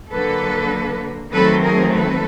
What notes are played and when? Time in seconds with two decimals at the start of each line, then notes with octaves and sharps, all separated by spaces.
0.10 D3 F#3 A#3 A4 B4
1.32 D#3 F#3 A3 C4 A4 B4
1.63 G#4 A#4
1.94 A4 B4